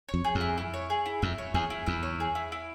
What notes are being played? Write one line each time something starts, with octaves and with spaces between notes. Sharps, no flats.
C#5
F2
G#4
F2
E4
E4
C#5
G#4
E4
F2 E4
C#5
E2 G#4
E4
E2 E4
C#5
G#4
E4
E4